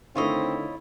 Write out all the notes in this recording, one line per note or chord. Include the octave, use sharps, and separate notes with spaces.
D3 D#3 A3 C4 E4 F4 C#5 D#5